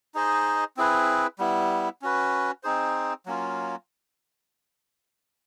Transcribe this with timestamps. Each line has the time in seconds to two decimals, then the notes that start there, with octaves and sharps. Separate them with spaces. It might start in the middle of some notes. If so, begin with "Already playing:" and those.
0.14 D#4 G#4 C5 D#5
0.77 C4 E4 G#4 B4
1.39 G3 B3 E4
2.02 C#4 F#4 B4
2.63 C4 D#4 G#4 C5
3.26 F#3 A#3 C#4 F4